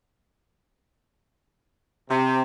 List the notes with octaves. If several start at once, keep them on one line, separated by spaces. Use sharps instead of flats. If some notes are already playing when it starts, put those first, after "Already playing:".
C3